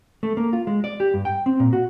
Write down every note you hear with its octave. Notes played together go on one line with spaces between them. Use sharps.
A3
A#3
F4
G#3
D5
G4
G2
G5
C4
A#2
F#4